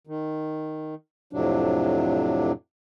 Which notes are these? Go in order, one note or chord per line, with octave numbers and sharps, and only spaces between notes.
D#3
F2 A2 C3 F#3 D4